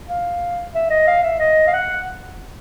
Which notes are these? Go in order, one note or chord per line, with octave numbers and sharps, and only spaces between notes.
F5
E5
D#5
F5
E5
D#5
F5
F#5